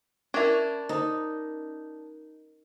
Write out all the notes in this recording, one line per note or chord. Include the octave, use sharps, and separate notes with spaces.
C#4 D4 E4 A#4
D#4